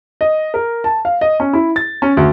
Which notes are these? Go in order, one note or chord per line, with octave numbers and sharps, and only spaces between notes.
D#5
A#4
A5
F5
D#5
C#4
E4
A6
C#4
D2